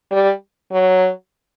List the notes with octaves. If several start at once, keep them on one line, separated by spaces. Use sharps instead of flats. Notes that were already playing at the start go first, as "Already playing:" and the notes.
G3
F#3